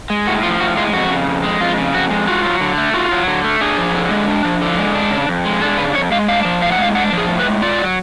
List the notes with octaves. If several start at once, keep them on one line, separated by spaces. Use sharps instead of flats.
G#3
A2 F#4
F3 F4
A2 F#4
G#3 F4
F2 F#4
C#3
F2
G#3
F2 F4
C#3
F2 F#4
G#3
F4 F#4
F#3
D3
A3
F4 F#4
F#3
D3
A3
D4 G#4
F3
D3
G#3
D4
F3
D3
G#3
D4
C#3
F2
G#3
D4 A4
C#3 B4
F2 C#5
G#3 F5
D4 F5
F3
A2 F5
F#5
G#3 F5
D4 F#5
F3
G#4
A2
B4
G#3
F4 D5
F#3